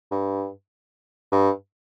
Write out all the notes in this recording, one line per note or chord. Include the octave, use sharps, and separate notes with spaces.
G2
G2